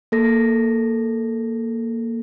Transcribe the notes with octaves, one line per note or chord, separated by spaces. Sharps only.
A#3 A4 A#6